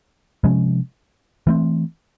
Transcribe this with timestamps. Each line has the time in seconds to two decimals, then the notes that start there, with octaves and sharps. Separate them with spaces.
0.44 C3 F3 G#3 C#4
1.47 E3 A3 C4